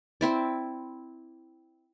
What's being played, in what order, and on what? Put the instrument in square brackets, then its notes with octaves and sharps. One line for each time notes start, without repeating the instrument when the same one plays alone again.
[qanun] C4 E4 D5